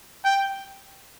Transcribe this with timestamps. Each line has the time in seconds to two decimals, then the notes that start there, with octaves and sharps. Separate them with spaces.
0.25 G5